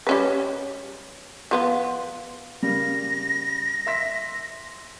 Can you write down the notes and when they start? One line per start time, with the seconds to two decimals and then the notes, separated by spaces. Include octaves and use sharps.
0.07 G3 C#4 B4
1.51 F3 B3 F4
2.63 C#3 G3 A#3 A#6
3.86 E5 C6 B6